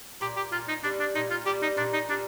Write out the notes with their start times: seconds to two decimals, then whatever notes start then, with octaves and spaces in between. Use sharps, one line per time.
0.21 A#2 G4
0.37 G4
0.52 A#2 F4
0.68 D#4
0.84 G3 D4
1.00 D4
1.15 A#2 D#4
1.31 F4
1.46 G3 G4
1.62 D#4
1.77 A#2 D4
1.93 D#4
2.09 G3 D4